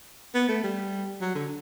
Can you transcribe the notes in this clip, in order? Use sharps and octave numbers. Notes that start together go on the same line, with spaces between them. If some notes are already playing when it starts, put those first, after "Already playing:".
B3
A3
G3
F#3
D3